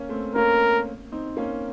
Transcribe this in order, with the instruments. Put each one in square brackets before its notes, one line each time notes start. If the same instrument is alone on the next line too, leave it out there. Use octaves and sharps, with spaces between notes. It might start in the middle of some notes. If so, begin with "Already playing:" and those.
Already playing: [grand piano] A#3 C#4
A3 C4
[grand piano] A#3 C#4 [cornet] A#4
[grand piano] C4 D#4
A#3 C#4